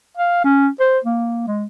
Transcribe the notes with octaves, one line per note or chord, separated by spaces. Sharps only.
F5
C#4
C5
A#3
G#3